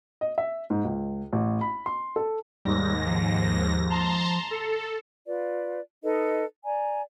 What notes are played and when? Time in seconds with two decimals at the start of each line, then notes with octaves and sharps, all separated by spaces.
0.21 D#5
0.38 E5
0.70 G#2
0.85 C#2
1.33 A1
1.61 B5
1.86 C6
2.16 A4
2.65 D#2 G#2 G3 A#6
3.07 F3
3.90 A5 A#5 C6
4.51 A4
5.27 F4 B4 D5
6.03 D#4 A4 B4 D#5
6.65 D5 G#5 A#5